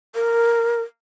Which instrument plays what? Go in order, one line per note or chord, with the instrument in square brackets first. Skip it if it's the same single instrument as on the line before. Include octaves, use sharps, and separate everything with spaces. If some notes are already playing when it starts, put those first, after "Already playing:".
[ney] A#4